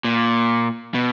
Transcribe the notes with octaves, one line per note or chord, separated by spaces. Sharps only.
A#2
B2